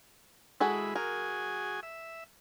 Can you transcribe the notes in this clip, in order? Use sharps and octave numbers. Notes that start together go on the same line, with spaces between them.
G#3 E4 F#4 G#4 A4 B5
F#4 G#4 A#4 G#5
E5